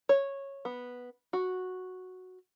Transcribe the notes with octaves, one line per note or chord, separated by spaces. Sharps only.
C#5
B3
F#4